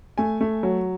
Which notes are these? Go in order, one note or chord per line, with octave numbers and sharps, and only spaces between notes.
A3 G#5
A3
F#3